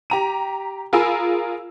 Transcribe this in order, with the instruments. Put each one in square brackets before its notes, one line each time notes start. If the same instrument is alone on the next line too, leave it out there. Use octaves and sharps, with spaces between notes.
[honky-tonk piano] G4 A#5 D#7
F4 G#4 A#4 G#5 B5 E6